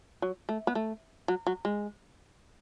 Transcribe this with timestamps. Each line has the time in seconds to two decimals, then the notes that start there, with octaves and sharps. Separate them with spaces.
0.22 F#3
0.49 A3
0.67 B3
0.75 A3
1.28 F#3
1.47 F#3
1.65 G#3